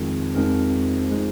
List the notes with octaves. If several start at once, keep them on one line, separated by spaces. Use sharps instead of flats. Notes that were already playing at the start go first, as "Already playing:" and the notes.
Already playing: F2 D#3 G#3
F2 F3 G#3 D#4 A#4
F3 G#3 D#4